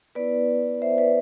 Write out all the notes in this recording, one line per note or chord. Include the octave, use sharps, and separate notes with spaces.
B3 E4 B4 D5
C5 E5
B4 D5